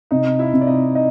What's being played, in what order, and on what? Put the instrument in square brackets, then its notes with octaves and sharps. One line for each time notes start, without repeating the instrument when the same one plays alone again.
[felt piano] C3 [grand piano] D#4 D#5
[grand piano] E4 E5
[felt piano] C3
[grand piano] D5
D#4 D#5
D#4 D#5